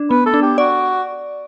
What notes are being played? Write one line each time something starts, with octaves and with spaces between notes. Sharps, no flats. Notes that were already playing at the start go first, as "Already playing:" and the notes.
Already playing: D4
B3 B4
A4
D4
G4
F#4 D5